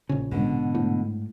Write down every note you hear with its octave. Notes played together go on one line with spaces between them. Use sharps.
A#1 C#3
G#2 B2 D3
A2